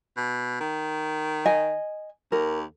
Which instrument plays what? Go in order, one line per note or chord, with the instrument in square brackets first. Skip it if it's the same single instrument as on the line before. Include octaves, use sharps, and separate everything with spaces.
[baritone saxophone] B2
D#3
[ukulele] D#5 G#5
[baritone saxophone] D#2 [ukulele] A#4